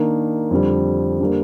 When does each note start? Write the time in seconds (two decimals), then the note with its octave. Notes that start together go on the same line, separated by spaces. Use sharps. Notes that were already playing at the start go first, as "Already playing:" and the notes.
Already playing: D#3 A#3 D4
0.51 F2 D3 G3
1.20 D3 G3 A#3